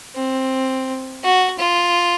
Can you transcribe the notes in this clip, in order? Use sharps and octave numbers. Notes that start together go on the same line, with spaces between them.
C4
F#4
F4